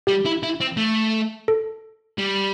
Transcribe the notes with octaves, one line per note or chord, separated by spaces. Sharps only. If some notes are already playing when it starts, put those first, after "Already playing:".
G3 G4
E4
E4
C4
A3
A4
G3